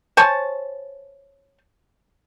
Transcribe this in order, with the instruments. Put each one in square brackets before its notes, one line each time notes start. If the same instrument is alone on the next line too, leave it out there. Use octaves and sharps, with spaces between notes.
[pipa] C5 C#5 G#5 A5